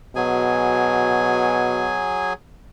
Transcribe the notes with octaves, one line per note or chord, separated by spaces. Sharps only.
B2 F#3 G#4 G#5